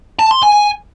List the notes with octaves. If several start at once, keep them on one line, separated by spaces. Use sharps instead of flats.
A5
C6
G#5